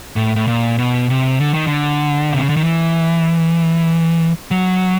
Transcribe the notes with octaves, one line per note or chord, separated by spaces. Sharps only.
A2
A2
A#2
B2
C3
D3
D#3
D3
C3
C#3
D3
D#3
E3
F#3